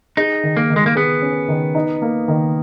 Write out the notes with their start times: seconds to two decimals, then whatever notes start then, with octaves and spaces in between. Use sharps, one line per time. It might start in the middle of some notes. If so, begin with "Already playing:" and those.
0.17 D#4 G#4
0.43 D#3
0.57 A#3
0.70 D#3
0.76 G#3
0.86 A#3
0.96 B3 G#4
1.22 C#4
1.49 D#3
1.75 D#4
2.02 A#3
2.28 D#3